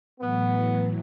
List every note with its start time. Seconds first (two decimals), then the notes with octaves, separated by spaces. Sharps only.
0.20 A2 E3 F#3 B3